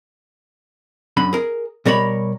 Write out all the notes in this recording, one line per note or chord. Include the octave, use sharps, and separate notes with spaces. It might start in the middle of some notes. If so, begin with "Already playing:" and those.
F#2 D3 B5
G#4 A#4
B2 G3 A#4 C#5 B5